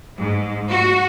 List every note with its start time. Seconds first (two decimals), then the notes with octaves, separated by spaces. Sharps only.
0.18 G#2
0.69 F#4